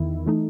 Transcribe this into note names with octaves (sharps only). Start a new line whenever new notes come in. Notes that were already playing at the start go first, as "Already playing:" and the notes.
Already playing: E2 D#3 E4
E3 A3 D#4